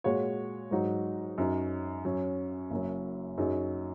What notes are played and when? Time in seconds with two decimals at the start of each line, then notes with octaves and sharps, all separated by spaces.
0.04 A#2 G#3 F#4 C#5
0.71 G#2 F#3 D#4 F#4
1.38 F#2 F#3 D#4
2.05 F#2 F#3 C#4
2.70 F#1 F#2 F#3
3.38 F#2 F#3 D#4 G#4